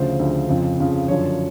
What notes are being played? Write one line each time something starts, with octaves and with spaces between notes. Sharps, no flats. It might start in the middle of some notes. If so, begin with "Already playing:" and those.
Already playing: D2 C#3 F3 C5
D2 C#3 F3
F2 C#3 F3
F2 C#3 F3
F#2 D3 F3 C#5